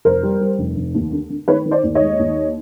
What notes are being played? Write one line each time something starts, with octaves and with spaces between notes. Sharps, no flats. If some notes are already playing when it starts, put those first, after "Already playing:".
F1 A#4 C5
G3
G3
F1
F1
D#2
D3
D3
D#3 B4 C#5
D#3
C5 D5
D#2
C#5 D#5
G#3
D#2